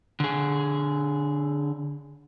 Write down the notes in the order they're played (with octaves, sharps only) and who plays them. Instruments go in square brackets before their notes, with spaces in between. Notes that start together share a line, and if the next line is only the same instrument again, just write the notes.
[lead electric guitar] D3 G#4